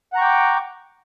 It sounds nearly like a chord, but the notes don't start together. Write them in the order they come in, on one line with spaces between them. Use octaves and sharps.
F#5 A#5 C#6 G5 D6